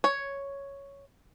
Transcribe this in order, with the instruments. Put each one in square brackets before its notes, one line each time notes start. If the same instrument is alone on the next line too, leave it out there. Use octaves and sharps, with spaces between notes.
[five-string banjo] C#5